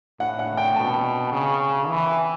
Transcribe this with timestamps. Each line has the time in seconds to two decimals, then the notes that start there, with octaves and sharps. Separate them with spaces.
0.20 A2 F#5
0.39 F#5
0.57 G5
0.76 B2 A5
1.32 C#3
1.88 E3